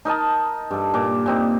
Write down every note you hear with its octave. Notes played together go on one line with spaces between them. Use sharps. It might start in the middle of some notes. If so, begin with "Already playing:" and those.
D#4 A#4 D#5 A5
G2 A4
A#2 D6
A#2 C4 D#4